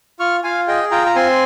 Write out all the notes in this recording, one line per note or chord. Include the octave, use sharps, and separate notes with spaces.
F4 C#6 F6
F4 F5 G#5
G#4 D#5 G5
F4 G5 A#5
A#5
C4 G#5 C6